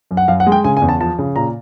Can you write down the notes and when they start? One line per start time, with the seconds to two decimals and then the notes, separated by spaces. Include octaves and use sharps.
0.11 F#2
0.17 F#5
0.28 F#2 F5
0.40 F#5
0.47 G#3
0.52 G5
0.64 C#3 G#5
0.77 G#5
0.82 E2
0.89 A5
1.00 F3 A5
1.19 C#3
1.36 A#2 A#5